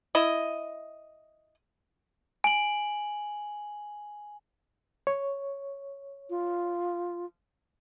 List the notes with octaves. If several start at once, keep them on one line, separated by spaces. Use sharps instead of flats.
E4 D#5
G#5 F#7
C#5
F4